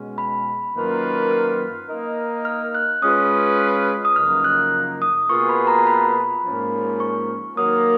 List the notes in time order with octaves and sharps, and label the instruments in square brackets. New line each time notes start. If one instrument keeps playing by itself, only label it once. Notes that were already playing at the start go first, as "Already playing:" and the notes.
Already playing: [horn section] B2 G#3 C#4
[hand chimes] B5
[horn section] F#2 D#3 A#3 F4 B4
[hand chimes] F6
[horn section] A#3 D#4 A#4 D#5
[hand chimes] F6
F#6
[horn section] G#3 C#4 F4 B4 [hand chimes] D#6
[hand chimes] D#6
[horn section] F#2 C#3 F3 A#3 D#4 [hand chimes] F6
[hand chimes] F#6
D#6
[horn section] B2 A#3 F4 G#4 B4 [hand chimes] C#6
[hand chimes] B5
A#5
B5
[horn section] G#2 F3 A#3 C#4
[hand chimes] C#6
[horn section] D#3 F#3 A#3 [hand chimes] D#6